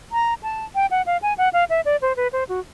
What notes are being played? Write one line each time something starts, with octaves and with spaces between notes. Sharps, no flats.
A#5
A5
G5
F#5
F5
G#5
F#5
F5
E5
D5
C5
B4
C5
F#4